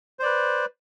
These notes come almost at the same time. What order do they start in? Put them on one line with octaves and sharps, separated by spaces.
C5 D5 B4